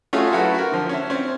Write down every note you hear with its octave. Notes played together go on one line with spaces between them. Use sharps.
A3 C#4 F4 F#4 G#4 A4
F#3 A3 E4 F#4 A4 B4
F#4 A#4
D3 F3
C#4 E5
C4 C#4